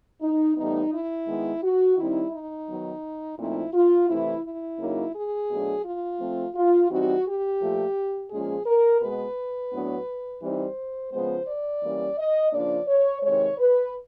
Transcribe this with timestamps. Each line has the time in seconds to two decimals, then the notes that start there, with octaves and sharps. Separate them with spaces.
0.22 D#4
0.57 A2 E3 G3 B3 D#4
0.93 E4
1.28 D#3 G#3 B3
1.63 F#4
1.98 D#3 G3 C4 D#4 E4
2.32 D#4
2.68 D#3 F#3 B3
3.39 A#2 F3 A3 C4 D#4 E4
3.74 F4
4.08 C3 E3 A3 E4
4.44 E4
4.79 C#3 F#3 A#3 D#4
5.14 G#4
5.50 B2 F#3 A3 D4
5.84 F4
6.20 F3 A3 C4
6.55 F4
6.90 E3 G3 C4 D#4 F#4
7.26 G4
7.60 A#2 F3 A3
8.31 A#2 F3 G#3 C#4 G#4
8.66 A#4
9.01 B2 G#3 B3 B4
9.72 A2 F#3 B3 D4
10.41 E3 G3 C4 D#4 C5
11.12 C#3 F3 G#3 B3 C5
11.47 D5
11.82 E3 G3 A#3 C#4
12.18 D#5
12.53 C#3 F3 A#3 D4 D5
12.88 C#5
13.23 C3 D#3 G#3 C#5
13.58 B4